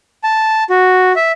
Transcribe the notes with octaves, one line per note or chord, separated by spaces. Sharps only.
A5
F#4
E5